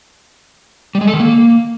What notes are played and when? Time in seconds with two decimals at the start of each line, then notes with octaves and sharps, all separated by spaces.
0.95 G3
1.01 G#3
1.07 A4
1.14 D#3
1.20 A#3